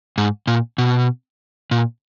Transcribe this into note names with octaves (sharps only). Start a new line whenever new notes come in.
G#2
A#2
B2
A#2